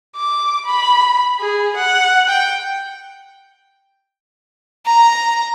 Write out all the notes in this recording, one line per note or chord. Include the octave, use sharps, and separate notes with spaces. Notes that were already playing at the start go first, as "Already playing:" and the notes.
D6
B5
G#4
F#5
G5
A#5